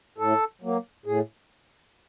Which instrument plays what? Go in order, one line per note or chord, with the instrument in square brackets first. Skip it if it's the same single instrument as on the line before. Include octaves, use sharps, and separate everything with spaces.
[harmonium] A2 A4
F#3 A#3
A2 G#4